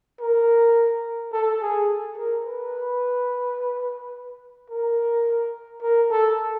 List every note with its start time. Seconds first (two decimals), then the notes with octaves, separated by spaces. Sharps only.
0.21 A#4
1.33 A4
1.61 G#4
2.18 A#4
2.45 B4
4.70 A#4
5.83 A#4
6.11 A4